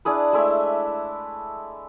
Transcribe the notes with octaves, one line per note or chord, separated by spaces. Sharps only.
D4 E4 G#4 B4
G#3 A3 E4 E5